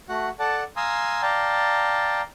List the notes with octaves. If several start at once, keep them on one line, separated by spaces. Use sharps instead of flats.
A3 F#4 F#5
A4 D5 F#5 A5
F5 G#5 A#5 C6 D#6 E6
D5 F5 G5 A5 A#5